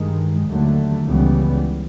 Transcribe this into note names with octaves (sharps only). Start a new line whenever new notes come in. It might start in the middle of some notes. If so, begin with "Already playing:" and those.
Already playing: G2 D#3 G#3
D#2 D3 F#3 A3
C#2 C#3 E3 G3 B3